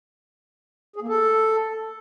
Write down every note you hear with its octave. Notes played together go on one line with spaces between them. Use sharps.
G#4
A#3
A4